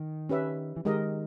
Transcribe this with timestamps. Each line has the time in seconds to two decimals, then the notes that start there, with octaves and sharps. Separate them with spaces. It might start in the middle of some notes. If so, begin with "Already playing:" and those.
Already playing: D#3
0.29 C#4 G4 B4 E5
0.76 E3
0.85 D#3 G#3 D#4 G4 A#4 D#5